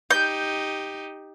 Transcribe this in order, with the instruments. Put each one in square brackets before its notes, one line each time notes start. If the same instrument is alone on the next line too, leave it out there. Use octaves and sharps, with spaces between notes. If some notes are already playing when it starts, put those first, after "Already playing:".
[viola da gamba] D#4 G4 [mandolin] G6